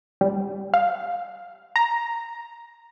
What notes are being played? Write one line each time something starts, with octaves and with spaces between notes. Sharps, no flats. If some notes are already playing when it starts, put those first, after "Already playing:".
G3
F5
A#5